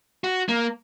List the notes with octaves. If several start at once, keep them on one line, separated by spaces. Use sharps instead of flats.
F#4
A#3